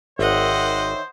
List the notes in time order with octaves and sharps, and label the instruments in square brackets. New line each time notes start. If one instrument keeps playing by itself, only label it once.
[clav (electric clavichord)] G#1 [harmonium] D#3 C#5 E5 [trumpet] C5 [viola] D#5 F#5